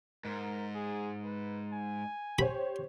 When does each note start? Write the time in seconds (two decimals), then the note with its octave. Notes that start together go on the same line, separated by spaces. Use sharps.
0.25 G#2 A#4
0.75 G#4
1.24 B4
1.72 G#5
2.39 G4 C5 C#5 B5